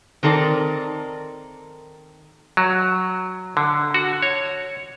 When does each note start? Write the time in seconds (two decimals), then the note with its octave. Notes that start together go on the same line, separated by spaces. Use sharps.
0.23 D#3 C4 A4 A#4 D5
2.57 F#3
3.57 D3
3.94 F#4
4.22 C#5